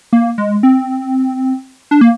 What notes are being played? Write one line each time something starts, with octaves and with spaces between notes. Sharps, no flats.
A#3
G#3
C4
D4
A#3